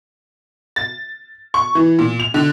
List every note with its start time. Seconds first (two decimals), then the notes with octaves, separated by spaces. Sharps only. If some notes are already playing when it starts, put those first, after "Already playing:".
0.76 A6
1.54 C#6
1.75 E3
1.99 A#2
2.20 F7
2.34 D3